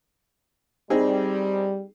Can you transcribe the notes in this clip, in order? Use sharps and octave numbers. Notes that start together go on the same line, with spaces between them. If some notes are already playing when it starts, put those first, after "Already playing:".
G3 C4 D#4 G#4